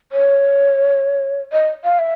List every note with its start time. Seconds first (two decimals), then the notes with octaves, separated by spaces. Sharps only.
0.12 C#5
1.52 D#5
1.84 F5
1.99 E5